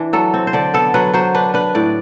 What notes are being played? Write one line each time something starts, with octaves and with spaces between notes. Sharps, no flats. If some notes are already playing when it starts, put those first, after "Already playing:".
Already playing: E3 D4
F#3 A4
C4
C5
D3 D5
B3 A4
F#3 B4
F#3 C5
D4 B4
D4 B4
A2 D5